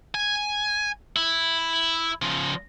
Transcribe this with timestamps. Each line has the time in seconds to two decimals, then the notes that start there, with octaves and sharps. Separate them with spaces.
0.14 G#5
1.16 E4
2.22 C#3 F3